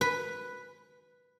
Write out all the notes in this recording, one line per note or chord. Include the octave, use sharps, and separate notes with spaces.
B4